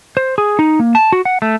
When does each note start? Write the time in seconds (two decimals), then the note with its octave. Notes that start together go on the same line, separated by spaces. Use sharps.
0.17 C5
0.38 G#4
0.59 D#4
0.79 A#3
0.95 A5
1.12 F#4
1.25 F#5
1.42 A3